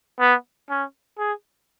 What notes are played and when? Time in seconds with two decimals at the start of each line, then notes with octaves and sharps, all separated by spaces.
0.20 B3
0.69 C#4
1.18 G#4